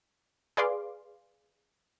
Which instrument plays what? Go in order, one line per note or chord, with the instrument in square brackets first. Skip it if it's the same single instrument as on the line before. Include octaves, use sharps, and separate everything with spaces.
[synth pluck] G#4 B4 D5 F5 C6 D6